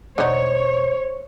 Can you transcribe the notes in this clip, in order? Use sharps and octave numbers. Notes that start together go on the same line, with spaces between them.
E1 D3 D#4 C5 C#5